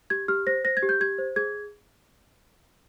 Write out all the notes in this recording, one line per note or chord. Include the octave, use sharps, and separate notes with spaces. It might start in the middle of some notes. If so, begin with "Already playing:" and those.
G4 G#6
G4 F6
C5 A#6
C5 A#6
G#6
G4
G6
G4 G#6
C5
G#4 G#6